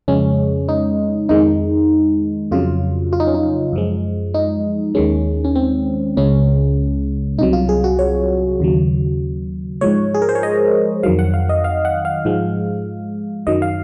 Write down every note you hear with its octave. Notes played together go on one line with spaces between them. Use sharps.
F2 C#3 G#3 C#4
D#4
F2 D#3 G#3 D#4
F2 C#3 F#3 F4
F4
D#4
C#4
D#4
F#2 F3 G#3
D#4
D#2 D#3 G#3 C#4
C#4
C4
C#2 C#3 G#3 C#4
C2 C3 F#3 D#4
F4
G#4
F#4
C#5
D#2 C#3 F#3
G#2 F3 G#3 C#5
G#4
A#4
C5
C#5
D#5
F2 D#3 F#3 F5
F#5
F5
D#5
F5
F#5
F5
G#2 F3 G#3
F#2 D#3 F#3 D#5
F5